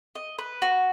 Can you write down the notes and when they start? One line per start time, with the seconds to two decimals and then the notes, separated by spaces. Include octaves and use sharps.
0.15 D#5
0.38 B4
0.62 F#4